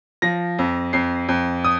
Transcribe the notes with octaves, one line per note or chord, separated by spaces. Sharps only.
F3 A#6
F2
F2 C7
F2
D#6